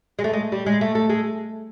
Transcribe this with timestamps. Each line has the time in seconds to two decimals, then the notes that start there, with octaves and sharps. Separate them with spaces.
0.19 G#3
0.24 A3
0.33 G#3
0.52 G3
0.66 G#3
0.81 A3
0.95 A3
1.09 G#3